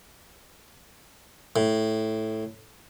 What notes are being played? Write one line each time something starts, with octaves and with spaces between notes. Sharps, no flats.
A2